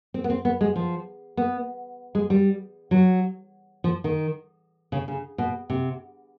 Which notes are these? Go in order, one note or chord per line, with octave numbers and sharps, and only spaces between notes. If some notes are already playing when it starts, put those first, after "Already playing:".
C4
B3
C4
B3
G#3
F3
B3
G#3
G3
F#3
F3
D#3
C#3
C#3
B2
C3